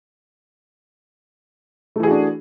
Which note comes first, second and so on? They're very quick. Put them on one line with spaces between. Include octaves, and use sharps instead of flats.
A3 E3 G#4 F#4 D4